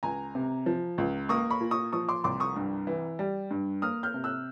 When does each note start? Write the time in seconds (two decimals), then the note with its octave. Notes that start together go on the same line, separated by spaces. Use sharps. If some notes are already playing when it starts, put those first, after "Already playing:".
0.03 C#2 G#5 A#5
0.35 C3
0.66 F3
0.98 C#2
1.29 A#3 C#6 D#6
1.50 B5 C#6
1.61 A#2
1.71 C#6 D#6
1.92 F3 C#6 D#6
2.09 C6 D6
2.24 C2 C6 D6
2.40 C#6 D#6
2.56 G2
2.87 E3
3.19 G3
3.51 G2
3.82 A#3 D#6 F6
4.03 F6 G6
4.14 C3
4.24 E6 F#6